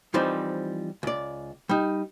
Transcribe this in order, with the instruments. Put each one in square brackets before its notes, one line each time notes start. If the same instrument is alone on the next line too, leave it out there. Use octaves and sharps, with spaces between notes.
[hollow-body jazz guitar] E3 F3 G3 C4 D#4
C#2 D5
G3 D#4